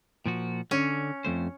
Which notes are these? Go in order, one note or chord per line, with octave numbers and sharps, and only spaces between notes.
A#2 F3 F#4
D3 C#4
F2 A3 C5